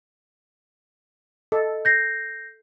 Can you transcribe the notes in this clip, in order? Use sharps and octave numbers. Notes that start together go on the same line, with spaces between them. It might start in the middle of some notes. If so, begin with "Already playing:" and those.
A4 D#5
G6 A#6 C7